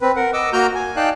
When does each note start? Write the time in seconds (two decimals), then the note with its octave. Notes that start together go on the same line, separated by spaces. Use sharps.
0.01 C4 B4
0.16 A#4 F#5
0.33 D#5 D6 E6
0.53 A#3 F#4 A#5 F6 G6
0.75 G#5
0.96 D#4 D5 F5 G5 A5 F#6